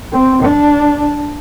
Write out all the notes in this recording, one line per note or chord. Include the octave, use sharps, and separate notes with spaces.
C4
D4